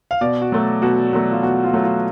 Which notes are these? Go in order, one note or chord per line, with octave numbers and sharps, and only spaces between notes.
F5
B2 D5
F#4
F#3 A3
B2 F#4
F#3 A3
F4
B2 F#4
F4
F#3 A3
F4